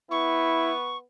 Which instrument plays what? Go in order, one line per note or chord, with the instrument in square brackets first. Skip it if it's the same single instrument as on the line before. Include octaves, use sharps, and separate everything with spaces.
[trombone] B3 [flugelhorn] E4 [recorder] C#6